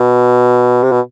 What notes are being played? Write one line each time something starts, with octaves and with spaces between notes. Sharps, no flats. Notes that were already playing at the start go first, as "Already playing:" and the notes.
Already playing: B2
C3
B2